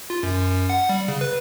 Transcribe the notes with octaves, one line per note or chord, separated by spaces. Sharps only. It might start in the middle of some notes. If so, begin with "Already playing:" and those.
F4
F#2
F#2
F#5
G3
C#3
B4